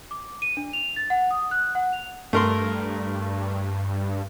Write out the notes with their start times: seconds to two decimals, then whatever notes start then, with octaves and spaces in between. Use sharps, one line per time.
0.11 D6
0.42 D#7
0.57 D4
0.73 F7
0.96 A6
1.10 F#5
1.31 D#6
1.51 F#6
1.75 F#5
1.93 F7
2.33 G2 A3 A#4 C6